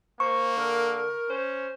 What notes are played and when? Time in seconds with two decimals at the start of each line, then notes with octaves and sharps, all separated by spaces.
0.20 A#3 C5 C#6
0.56 D3 A#4
1.29 C#4 C5